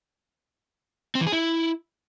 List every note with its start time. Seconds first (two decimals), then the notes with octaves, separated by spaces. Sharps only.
1.15 C4
1.21 E3
1.27 G#4
1.32 E4